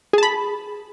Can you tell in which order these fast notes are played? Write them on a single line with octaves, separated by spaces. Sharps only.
G#4 A5 B5